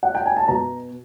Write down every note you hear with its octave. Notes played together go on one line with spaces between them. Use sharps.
F#5
G5
G#5
A5
B2 A#5